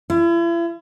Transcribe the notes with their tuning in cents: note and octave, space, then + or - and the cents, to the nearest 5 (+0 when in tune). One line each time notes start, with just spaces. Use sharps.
E4 +40